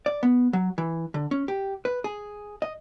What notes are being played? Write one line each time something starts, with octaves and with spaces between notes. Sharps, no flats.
D5
B3
F#3
E3
D3
C#4
G4
B4
G#4
D#5